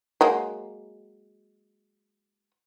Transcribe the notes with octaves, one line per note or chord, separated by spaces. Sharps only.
F#3 G#3 A#3